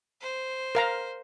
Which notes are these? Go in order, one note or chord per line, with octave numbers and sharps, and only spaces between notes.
C5
A#4 F5 A#5